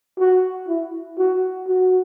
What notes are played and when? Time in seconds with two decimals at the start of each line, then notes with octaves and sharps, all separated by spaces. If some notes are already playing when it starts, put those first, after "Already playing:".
0.19 F#4
0.68 E4
1.18 F#4
1.67 F#4